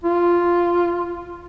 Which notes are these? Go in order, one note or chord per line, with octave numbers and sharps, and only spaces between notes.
F4